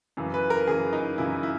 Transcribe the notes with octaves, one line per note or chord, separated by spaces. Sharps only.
F#2 C#3 E3
B4
A#4
F#2 C#3 E3 G#4
D#4
F#2 C#3 E3 E4
E4